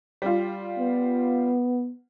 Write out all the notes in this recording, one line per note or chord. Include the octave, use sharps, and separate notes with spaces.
G3 F4
B3